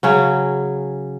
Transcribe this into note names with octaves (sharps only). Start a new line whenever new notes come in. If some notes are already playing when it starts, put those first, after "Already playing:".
C#3 F#3 C#4